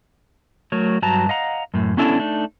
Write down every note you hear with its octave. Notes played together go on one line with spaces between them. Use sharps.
F#3 A3 A#4 C#5
G2 F#3 B4 G5 A5 A#5
D#5 F5 F#5 A#5
F#2 A2
B3 C#4 D4 E4 A4 D5
A3 D4 D#4